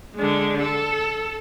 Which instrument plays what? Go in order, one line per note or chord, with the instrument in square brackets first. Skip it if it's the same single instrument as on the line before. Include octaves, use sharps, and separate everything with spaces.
[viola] D3 G#3
A4